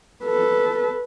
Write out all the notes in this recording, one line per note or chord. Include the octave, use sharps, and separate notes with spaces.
A4 B4